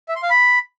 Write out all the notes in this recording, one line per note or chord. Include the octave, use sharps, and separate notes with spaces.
E5
C6
F5
B5